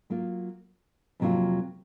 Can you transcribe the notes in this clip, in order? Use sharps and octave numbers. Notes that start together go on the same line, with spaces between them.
F#3 A#3 F4
F2 C3 F#3 A#3 F4